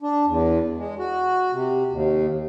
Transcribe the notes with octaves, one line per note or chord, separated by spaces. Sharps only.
D4
E2
G#3
F#4
C3
D#2